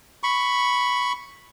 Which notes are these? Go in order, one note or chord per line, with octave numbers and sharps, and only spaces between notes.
B5 C#6